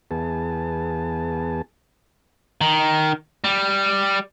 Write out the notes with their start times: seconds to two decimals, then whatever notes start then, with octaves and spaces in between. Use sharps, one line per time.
0.11 E2 B3 G#4 A5
2.61 D#3
3.44 G3